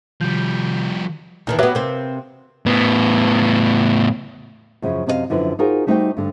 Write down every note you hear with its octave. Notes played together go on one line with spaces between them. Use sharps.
C3 D#3 F3 G3 G6
D#2 D#3 E3 D#4
F#3 B3 G4 B4 E5
C3 A#3 C4
A2 B3
F#2 C#3 F3
F#2 C3 D4 E4 D#5 F5
F#2 D3 F3 E4 B4
D#4 F4 F#4 G#4 A#4 C5
G3 A3 D#4 F#4 C5 G5
G2 D3